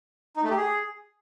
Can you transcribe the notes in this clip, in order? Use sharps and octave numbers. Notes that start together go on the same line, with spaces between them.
D#4
A3
G4
G#4